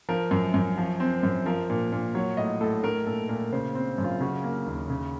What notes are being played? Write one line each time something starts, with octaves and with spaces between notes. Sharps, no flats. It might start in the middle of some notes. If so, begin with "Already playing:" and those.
F3 A#4
F#2
F#2
F3
C4
F#2
F3 A#4
A#2
A#2
F#3 C#5
A2 D#5
A2 A4
A3 A#4
A#2 A4
A#2 A#4
C#3 C5
C4
F#2
F4
C#3 F#4
A#3
D#2
C#3